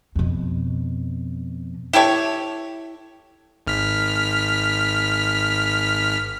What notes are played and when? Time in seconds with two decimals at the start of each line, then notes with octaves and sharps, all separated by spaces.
0.15 F2 B2
1.93 E4 G4 A4 C#5
3.67 G#1 F6 B6